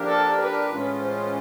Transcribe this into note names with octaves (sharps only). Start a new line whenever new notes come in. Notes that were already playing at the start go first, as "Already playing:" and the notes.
Already playing: F3 A#3 D4 G4 A#4
A4
B4
A2 E3 G#3 C#4 F4
C5